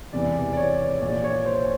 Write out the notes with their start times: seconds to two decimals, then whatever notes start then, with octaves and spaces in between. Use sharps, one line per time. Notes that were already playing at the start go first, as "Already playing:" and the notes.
0.13 E1 E2 C3 E3 D5
0.53 D5
0.57 C#5
1.02 A#1 A#2 D5
1.24 C#5
1.46 C5